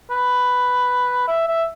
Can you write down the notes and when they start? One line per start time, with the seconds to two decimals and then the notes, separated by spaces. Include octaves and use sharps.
0.11 B4
1.28 E5
1.48 E5